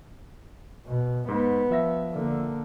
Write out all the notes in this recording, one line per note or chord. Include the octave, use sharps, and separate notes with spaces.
B2
G#2 B3
F3 E5 A#6
D3 A#3